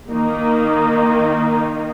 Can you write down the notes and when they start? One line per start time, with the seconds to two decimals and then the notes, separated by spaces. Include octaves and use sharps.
0.11 D#3 A#3 D#4